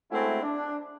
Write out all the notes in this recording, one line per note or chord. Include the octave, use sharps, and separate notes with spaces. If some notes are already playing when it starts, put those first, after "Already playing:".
G#3 A3 C4 C#4 E4 F#4
D4